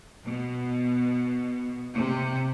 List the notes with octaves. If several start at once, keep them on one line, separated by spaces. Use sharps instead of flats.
B2
C3